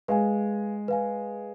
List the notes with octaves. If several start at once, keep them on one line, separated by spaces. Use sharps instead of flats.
G#3 B4 F5 G#5
B4 F5 G#5